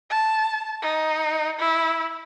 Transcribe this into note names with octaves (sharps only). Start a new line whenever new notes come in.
A5
D#4
E4